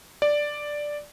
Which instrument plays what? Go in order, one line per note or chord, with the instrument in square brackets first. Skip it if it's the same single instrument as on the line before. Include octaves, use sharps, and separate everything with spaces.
[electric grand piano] D5